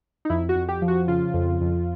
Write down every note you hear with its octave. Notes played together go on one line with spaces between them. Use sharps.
D#4
F2 E4
F#4
F2
G4
F3
F#4
C#3 F4
F2
F2